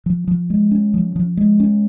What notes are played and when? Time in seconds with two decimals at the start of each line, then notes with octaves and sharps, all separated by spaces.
0.06 F3
0.28 F3
0.50 G#3
0.71 C#4
0.94 F3
1.16 F3
1.37 G#3
1.60 C#4